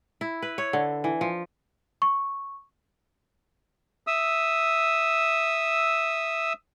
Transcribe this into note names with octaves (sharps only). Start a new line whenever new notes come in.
E4
B4
C#5
D3
E3
F3
C#6
E5 D#6 E6